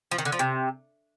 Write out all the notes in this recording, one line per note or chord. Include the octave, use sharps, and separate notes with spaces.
F3
D#3
D3
F3
C3